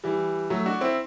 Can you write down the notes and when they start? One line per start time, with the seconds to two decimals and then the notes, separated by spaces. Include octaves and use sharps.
0.04 E3 G3
0.50 F#3 A3
0.66 D4 F#4
0.81 C4 E4